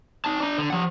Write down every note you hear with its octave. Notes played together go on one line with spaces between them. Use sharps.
D#4 A5
D4 A#5
D3
F3 F#5